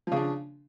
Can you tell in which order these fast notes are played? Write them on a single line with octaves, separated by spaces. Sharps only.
F3 C#3 D4